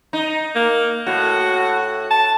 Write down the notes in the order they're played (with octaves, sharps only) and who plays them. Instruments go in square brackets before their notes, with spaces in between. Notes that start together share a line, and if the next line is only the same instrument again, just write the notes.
[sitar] D#4
[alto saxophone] A#3
[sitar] A2 [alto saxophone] F#4
[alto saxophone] A5